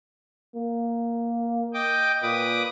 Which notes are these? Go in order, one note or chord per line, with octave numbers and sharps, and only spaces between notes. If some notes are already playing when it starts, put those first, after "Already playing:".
A#3
D#5 G5 D6
A#2 B4 D6 D#6